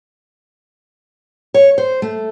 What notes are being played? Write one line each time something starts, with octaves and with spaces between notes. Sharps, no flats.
C#5
C5
A3